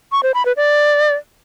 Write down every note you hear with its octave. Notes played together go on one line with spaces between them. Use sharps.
C#6
C5
B5
B4
D5